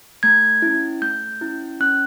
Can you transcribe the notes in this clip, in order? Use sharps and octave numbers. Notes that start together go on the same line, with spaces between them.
A3 G#6
C#4 E4
A3 G6
C#4 E4
C#4 F#6